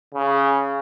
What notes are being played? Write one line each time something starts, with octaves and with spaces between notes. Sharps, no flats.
C#3